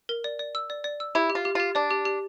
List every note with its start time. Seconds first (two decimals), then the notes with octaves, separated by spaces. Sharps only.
0.09 A#4
0.24 D5
0.39 D5
0.55 E6
0.70 D5
0.84 D5
1.00 E6
1.15 E4 G4
1.30 G4
1.35 F4
1.45 G4
1.55 F4 G4
1.75 D4 D5
1.90 G4
2.05 G4